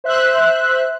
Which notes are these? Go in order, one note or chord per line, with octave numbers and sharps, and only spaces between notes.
C5 E5 F#6